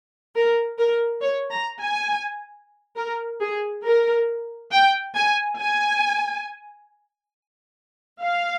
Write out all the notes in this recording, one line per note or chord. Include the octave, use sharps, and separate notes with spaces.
A#4
A#4
C#5
A#5
G#5
A#4
G#4
A#4
G5
G#5
G#5
F5